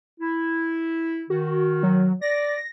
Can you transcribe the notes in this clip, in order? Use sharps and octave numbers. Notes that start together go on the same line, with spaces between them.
E4
D#3 F#4
F#3
D5 A#6